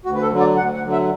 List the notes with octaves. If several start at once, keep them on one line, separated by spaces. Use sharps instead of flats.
D2 F#4
B4
A4
D3 F#3
D5
D2 F#5
F#5
D3 F#3
E5